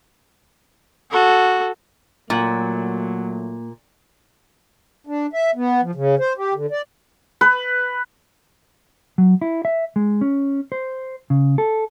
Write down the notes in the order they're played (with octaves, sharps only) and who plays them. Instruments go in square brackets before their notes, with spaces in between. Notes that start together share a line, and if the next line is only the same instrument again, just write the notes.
[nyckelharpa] F#4 A4
[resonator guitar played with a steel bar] A#2 [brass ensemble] F#3 A3 [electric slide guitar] A#3 F#5
[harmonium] D4
E5
B3
F3
C#3
C5
G4
D3
D5
[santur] B4
[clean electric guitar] F#3
E4
E5
G#3
C#4
C5
C#3
A4